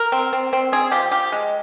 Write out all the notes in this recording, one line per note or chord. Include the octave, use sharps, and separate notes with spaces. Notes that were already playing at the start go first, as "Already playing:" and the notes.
Already playing: A#4
C4
C4
C4
C4 G#4
F3 G4
F3 G4
G#3